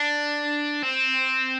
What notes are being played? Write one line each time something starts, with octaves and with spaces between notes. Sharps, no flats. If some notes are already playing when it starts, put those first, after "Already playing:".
Already playing: D4
C4